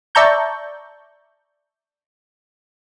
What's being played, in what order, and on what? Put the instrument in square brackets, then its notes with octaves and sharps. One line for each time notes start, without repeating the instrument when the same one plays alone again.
[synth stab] D5 E5 A5 A#5 C#6 G6